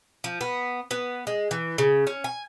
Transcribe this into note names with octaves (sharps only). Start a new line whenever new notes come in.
F3
B3
B3
G#3
E3
C#3
C#4
G#5